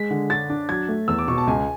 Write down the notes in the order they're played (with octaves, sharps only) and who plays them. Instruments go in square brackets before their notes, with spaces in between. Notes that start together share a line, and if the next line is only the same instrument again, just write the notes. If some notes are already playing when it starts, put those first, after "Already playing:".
Already playing: [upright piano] G#3 [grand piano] B6
[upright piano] D3
[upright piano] D4 [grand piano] A6
[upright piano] D4
[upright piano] F#3 [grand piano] G#6
[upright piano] A3
[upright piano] E2 [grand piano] E6
[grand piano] D6
[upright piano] B2 [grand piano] C#6
[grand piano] A5
[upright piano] C#2 [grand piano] G#5